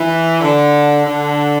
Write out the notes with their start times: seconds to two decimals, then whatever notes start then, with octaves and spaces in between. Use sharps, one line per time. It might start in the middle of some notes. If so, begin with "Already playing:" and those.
Already playing: E3
0.41 D3
1.06 D3